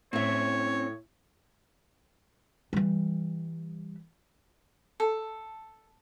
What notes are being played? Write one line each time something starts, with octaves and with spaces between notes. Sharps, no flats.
A2 C4 C#4 C#5 E5
E3 G3
A4